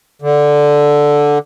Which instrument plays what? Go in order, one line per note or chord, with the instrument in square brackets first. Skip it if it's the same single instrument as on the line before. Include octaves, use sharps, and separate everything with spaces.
[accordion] D3